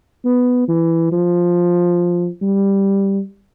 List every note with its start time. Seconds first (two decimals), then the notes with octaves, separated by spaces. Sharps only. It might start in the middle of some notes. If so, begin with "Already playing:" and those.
0.25 B3
0.68 E3
1.12 F3
2.42 G3